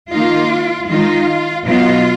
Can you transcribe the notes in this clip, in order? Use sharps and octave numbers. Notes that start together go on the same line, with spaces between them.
D#3 A#3 D#4 F4
D#3 G#3 D#4 F4
B2 F#3 B3 D#4 F4